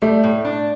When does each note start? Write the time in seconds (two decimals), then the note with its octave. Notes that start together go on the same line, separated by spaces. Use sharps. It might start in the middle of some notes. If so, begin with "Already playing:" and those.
0.02 G3 A3
0.23 A2
0.45 D4